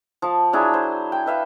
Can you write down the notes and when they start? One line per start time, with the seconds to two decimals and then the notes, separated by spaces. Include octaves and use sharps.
0.22 F3 A5
0.53 F#3 D4 E4 G#4
0.74 C5
1.12 G5
1.26 B4 E5 F5